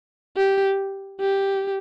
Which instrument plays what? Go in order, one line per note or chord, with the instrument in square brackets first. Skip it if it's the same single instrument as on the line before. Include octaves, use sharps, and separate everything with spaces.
[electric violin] G4
G4